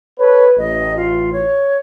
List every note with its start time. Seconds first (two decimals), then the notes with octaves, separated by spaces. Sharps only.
0.19 A4 B4 C#5
0.58 A1 D#5
0.96 F4
1.33 C#5